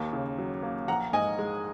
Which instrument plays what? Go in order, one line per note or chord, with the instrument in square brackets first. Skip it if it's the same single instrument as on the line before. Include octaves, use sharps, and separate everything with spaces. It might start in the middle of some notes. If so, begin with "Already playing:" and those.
Already playing: [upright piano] D#2 A#3
C#3
F#3
A#3
A#1 F#5 A#5
G#2 D#5 G#5
G#3